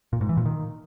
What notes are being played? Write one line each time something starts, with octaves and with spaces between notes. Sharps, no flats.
A#2
G#2
E3
A#2
D#3